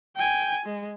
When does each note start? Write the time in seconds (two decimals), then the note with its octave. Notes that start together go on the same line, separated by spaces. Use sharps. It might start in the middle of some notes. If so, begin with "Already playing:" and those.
0.16 G5 G#5
0.66 G#3